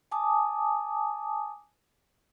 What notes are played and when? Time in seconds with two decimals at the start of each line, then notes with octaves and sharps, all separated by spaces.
0.11 G#5 A5 D6 D#6